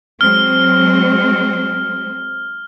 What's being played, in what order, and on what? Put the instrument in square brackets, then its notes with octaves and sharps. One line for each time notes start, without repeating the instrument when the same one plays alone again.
[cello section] F#3 G#3 C4 [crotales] F6